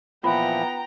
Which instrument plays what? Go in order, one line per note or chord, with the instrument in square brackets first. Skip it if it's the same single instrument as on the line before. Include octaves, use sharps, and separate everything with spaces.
[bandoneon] A#2 E3 F3 [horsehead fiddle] B3 [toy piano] F4 [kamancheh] G5 A#5